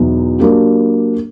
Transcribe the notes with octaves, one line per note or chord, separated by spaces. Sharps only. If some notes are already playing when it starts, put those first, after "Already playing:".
Already playing: E2 B2 F#3 B3 D#4
F#3 A#3 D4 G4